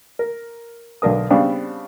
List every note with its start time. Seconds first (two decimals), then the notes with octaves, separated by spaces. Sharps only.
0.19 A#4
1.02 B1 D3 D4 A#4 D#6
1.30 C#3 G3 B3 C4 D4